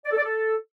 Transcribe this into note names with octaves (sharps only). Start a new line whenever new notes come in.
D5
A4
D5
A4